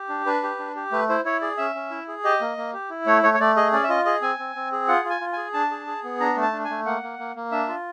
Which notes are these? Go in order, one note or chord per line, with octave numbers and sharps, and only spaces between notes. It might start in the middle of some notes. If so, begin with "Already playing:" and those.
Already playing: G4
D4
D4 B4
G4
D4
G4
A3 B4
E4 C5
E4 C#5
G#4 D5
C#4 E5
C#4
E4
G#4
G4 D#5
A#3
A#3
G4
E4
A3 C#5
A3 C#5
C#5
A3 D5
G#4 D#5
C#4 D5
E5
F4 D#5
G#4 D#5
C4 G#5
C4
C4
G#4
F4 F#5
F4
G#5
F4
G#4 G#5
D4 A5
G#4
G#4
B3
D4 A#5
A3
A5
D4
G#5
A3
A#3 F#5
A#3
A#3
A#3
D4 E5
F4